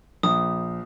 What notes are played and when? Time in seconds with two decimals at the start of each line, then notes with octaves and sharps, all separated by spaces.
0.23 A#1 D#6